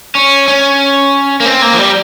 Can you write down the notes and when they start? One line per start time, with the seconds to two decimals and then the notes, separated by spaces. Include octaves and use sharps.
0.15 C#4
0.48 C#4
1.40 A#3
1.46 C4
1.62 A#3
1.73 F3
1.79 G3